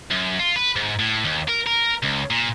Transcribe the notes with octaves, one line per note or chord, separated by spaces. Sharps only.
F#2
F4
B4
G#2
A2
D#2
A#4
A#4
C#2
A#2